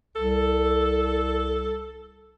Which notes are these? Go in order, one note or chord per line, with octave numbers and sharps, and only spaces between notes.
C2 A4